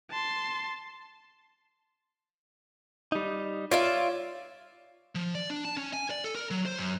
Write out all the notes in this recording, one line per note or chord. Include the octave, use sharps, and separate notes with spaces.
A5 C6
G3 D#4
F4 C#5 D5 E5
F3
D5
D4
A5
C#4
G#5
D5
A4
A#4
F#3
C5
F#2